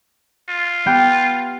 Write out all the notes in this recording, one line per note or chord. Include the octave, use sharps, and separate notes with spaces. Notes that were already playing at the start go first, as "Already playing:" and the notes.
F4
B3 G4 G5